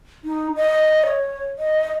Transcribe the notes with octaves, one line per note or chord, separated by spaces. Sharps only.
D#4
D#5
C#5
D#5